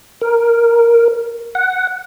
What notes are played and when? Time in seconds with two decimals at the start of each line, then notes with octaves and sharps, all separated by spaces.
0.21 A#4
1.55 F#5